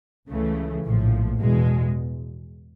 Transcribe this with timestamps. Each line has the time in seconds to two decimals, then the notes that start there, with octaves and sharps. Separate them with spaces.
0.29 C#2 C#3 E3 A3
0.84 A#1 A2 F3
1.38 E2 B2 G#3